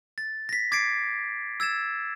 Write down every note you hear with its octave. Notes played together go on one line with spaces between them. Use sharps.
A6
A#6 B6
D6 G#6 A6 B6 C7 D7
E6 G#6 A6 E7